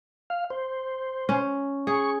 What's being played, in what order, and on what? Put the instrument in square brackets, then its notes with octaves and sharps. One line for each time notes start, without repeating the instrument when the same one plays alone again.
[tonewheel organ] F5
C5
[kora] C#4
[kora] G#4 [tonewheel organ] C#6